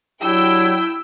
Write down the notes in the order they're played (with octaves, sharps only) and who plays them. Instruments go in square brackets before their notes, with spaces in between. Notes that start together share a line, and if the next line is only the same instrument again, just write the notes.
[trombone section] F#3 D4 G4 [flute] E4 [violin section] G5 [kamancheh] E6